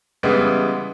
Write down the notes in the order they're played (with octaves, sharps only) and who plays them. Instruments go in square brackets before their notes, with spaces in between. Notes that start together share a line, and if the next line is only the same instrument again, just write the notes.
[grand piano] C#3 E3 G3 G#3 B3